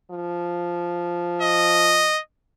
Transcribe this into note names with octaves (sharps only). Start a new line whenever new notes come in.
F3
D#5